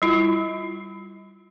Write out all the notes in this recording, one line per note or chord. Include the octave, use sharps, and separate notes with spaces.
G3 E4 F4